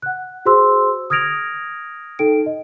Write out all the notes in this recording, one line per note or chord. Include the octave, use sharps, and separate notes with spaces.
F#5 F#6
F#4 G#4 C5 C6 E6
D#6 F6 G#6 A#6 D7 F7
D#4 A4 G5 D7
D#5